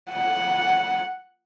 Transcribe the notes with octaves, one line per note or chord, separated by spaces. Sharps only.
F#5